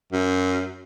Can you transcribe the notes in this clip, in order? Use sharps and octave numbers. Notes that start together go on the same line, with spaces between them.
F#2